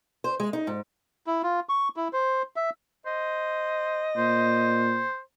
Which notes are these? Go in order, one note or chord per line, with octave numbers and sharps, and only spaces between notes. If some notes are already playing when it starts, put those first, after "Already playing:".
C5
G#3
D#4
G#2
E4
F4
C#6
E4
C5
E5
C5 D#5
A#2 C5